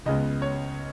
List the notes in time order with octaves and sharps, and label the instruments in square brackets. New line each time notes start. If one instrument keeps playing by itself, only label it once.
[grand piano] C#2 C#3 G#3 B3 D#5
C#5